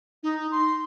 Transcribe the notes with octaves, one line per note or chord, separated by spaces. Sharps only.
D#4
C6